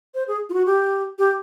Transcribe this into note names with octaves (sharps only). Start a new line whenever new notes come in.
C5
G#4
F4
F#4
G4
G4